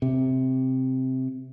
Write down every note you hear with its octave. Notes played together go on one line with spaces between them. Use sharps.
C3